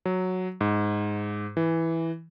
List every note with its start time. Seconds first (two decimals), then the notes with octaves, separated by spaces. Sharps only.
0.05 F#3
0.61 G#2
1.57 E3